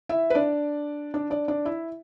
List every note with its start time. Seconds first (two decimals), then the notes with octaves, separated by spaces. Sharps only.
0.09 E4 E5
0.30 B4
0.35 D4 D5
1.14 D4 D5
1.30 D4 D5
1.48 D4 D5
1.65 E4 E5